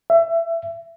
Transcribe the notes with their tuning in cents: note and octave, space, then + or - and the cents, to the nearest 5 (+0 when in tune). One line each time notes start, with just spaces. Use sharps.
E5 +25